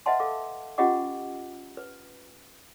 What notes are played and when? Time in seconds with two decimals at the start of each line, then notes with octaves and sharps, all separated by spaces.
0.06 B4 D#5 E5 F#5 A5 C6
0.20 A4 F5 D6
0.78 C#4 F4 G4 D#5 F#5 D6
1.77 B4